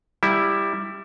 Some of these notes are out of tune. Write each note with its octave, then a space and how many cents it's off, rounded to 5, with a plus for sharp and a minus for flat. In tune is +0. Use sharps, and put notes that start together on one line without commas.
G3 +10 E4 +0